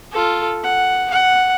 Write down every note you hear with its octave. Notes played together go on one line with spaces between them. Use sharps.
F4 A4
F#5
F#5